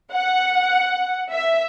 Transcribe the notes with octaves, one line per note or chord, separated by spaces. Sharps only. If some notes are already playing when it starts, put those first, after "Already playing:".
F#5
E5